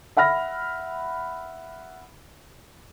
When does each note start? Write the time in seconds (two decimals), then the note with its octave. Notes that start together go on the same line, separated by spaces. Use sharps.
0.17 E5 F#5 B5 F6 A#6